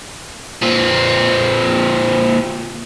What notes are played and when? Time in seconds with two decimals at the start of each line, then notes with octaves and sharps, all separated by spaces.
0.62 A#2 C4